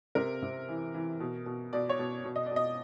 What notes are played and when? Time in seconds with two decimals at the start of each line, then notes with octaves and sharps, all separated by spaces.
0.15 C3 A#4
0.42 C3
0.69 E3
0.94 E3
1.20 B2
1.46 B2
1.73 B2 D5
1.89 C#5
1.99 B2
2.24 B2
2.36 D#5
2.46 B2 D5
2.56 D#5